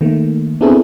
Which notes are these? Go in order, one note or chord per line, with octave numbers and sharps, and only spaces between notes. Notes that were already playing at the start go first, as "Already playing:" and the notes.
D#3 A3 A#3
B3 C4 D4 E4 G#4 A4